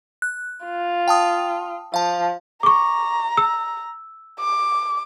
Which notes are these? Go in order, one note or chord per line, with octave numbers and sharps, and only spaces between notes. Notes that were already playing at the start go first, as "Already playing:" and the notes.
F#6
F4
G5 A5 D#6
F3 F5 A5
A#5 C#6 D6
E6
D6